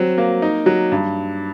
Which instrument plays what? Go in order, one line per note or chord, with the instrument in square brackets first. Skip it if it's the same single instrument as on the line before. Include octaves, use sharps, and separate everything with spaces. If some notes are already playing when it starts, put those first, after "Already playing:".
Already playing: [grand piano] F#3 C4
A#3
D#4
F#3
G2